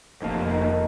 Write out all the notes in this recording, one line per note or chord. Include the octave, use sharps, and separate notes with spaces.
F1 D2 D#3 A#3 A5